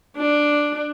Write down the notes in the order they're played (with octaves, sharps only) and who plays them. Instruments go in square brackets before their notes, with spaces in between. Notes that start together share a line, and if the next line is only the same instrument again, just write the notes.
[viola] D4